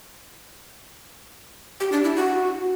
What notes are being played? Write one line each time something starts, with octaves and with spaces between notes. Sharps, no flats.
G4
D4
E4
F#4